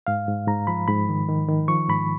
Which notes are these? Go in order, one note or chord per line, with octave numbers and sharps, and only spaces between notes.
G#2 F5
G#2
G#2 A#5
F3 B5
G#2 B5
D#3
D#3
D#3
F3 C#6
G#2 B5